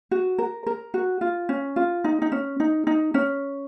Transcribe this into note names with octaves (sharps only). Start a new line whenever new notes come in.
F#4
A#4
A#4
F#4
F4
C#4
F4
D#4
D#4
C#4
D#4
D#4
C#4